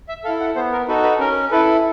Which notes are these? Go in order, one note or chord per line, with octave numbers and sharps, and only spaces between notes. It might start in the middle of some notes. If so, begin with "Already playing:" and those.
E5
E4 A4 F5
F#5
B3 C5
A#4
D#4 F#4 A4 B4
B4
C#4 A#4
E4 A4 B4